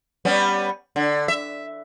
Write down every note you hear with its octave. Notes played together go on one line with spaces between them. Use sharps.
G3 B3 C#4
D3
E5